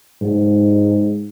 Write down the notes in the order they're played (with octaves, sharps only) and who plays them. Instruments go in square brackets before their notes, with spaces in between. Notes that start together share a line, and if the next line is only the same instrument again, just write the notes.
[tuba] G#2